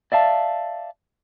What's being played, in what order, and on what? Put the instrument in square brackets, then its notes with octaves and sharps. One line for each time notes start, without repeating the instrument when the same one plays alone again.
[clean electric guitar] D5 E5 F5 A5